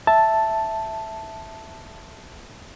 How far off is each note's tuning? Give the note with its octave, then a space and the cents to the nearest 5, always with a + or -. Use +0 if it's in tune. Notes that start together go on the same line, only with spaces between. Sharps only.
E5 +0 A5 +0